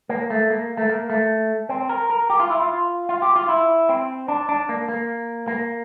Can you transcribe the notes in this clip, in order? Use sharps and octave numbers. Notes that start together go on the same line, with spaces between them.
A#3
A3
A#3
A3
A#3
A3
C4
A#4
A#4
G4
F4
E4
F4
F4
G4
F4
E4
C4
D4
D4
A#3
A#3
A#3